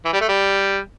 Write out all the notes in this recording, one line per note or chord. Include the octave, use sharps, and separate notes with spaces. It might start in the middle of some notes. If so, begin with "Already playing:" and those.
E3
G3
A3
G3